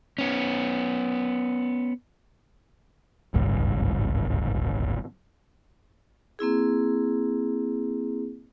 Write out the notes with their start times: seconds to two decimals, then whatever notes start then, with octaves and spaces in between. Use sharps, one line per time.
0.18 B3 C#4
3.34 D1 G#1 C#2 G2
6.39 A#3 C4 E4 G#4